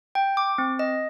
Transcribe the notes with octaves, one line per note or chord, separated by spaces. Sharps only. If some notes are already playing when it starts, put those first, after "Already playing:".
G5
D6
C4
D#5